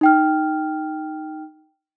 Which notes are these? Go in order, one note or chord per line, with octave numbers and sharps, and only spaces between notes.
D#4 G5 F6